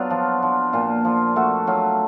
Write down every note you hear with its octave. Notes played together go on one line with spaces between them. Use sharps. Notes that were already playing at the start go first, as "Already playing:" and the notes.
Already playing: F#3 B3 D4 F4
F3
F3
A#2 F4
F3
A3 F#4
F#3 F4